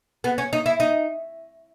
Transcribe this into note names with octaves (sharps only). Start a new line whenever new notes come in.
B3
C#4
D#4
E4
D#4